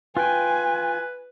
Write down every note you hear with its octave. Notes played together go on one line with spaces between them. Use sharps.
F4 B4 G5 G#5